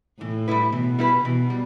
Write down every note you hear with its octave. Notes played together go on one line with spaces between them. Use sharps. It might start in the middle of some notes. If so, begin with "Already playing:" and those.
A2 E3
G3 E4 B4
B2 E3
G3 E4 B4
B2 E3
G3